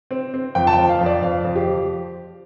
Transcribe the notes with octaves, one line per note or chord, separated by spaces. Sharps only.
C4
C4
F2 G5
A5
G5
F3
F5
F2
D5
F2 F5
F2
G4
F3